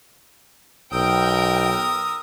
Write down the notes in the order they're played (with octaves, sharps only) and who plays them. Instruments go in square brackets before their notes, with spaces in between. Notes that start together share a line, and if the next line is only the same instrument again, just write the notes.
[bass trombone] B1 [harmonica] A#4 D#6 E6 [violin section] G5